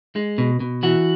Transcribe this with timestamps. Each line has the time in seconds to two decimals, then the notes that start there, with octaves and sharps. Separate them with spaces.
0.16 G#3
0.38 B2
0.60 B2
0.83 E3 F#4